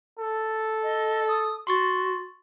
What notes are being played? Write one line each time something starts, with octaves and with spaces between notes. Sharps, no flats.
A4
D#5
D#6
F#4 C6 C#6 A6